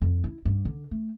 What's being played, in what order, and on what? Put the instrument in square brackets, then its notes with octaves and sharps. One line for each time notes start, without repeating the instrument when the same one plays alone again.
[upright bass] F2
E4
G2
D3
A3